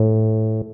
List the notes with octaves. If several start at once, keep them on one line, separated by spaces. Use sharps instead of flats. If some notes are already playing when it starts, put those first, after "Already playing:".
Already playing: A2